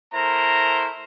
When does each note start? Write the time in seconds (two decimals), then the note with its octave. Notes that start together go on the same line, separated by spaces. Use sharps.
0.14 A3 E4 A#4 C5 A#5 C6